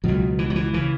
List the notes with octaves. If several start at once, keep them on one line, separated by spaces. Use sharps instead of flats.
C#2 B2 F#3
E3
F#3
E3
C#3 E3